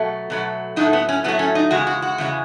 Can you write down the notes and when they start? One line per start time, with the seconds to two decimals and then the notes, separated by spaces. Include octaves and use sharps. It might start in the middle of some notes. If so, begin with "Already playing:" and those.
Already playing: B2 F#3 A3
0.30 B2 F#3 A3
0.76 A2 F#3 A3 D#4
0.93 B3
1.09 C#4
1.24 A2 F#3 A3 B3
1.39 C#4
1.55 D#4
1.71 E2 C#3 G#3 F#4
1.87 F#4
2.02 F#4
2.18 E2 C#3 G#3